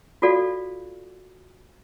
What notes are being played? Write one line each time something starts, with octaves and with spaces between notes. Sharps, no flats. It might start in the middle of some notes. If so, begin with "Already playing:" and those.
F4 F#4 A4 D5 F5